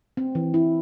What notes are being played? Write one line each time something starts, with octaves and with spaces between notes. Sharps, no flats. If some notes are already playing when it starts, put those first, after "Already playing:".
C4
E3
E4